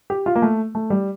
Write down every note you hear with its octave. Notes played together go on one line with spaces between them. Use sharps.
G4
F4
A#3
A3
A3
G3